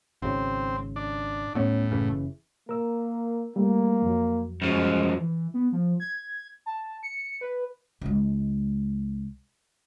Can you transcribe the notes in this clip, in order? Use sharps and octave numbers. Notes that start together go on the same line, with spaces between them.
G#1 C#3 C4
D4
D1 A2 B3 C#4
F#1 C#3 E3
A#3 A#4 E6
G3 A3 A#3
F2 F#3
F#2 F3 G#3
E3
B3
F3
G#6
A5
C#7
B4
C#2 G#3